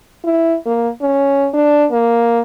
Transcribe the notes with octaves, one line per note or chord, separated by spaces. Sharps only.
E4
A#3
C#4
D4
A#3